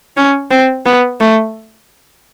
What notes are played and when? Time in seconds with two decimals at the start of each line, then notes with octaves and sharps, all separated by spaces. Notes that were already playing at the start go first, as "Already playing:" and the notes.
0.17 C#4
0.51 C4
0.85 B3
1.20 A3